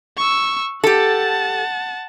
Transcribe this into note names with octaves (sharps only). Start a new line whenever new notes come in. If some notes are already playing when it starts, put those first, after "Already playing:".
C#6 E6
G4 A4 F#5 A5